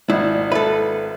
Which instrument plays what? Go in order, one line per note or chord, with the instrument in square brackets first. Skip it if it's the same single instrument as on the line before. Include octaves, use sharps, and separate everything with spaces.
[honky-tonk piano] G#1 [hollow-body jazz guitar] E4 [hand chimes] D5 D#5
[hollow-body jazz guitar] A4 B4 [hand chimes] E5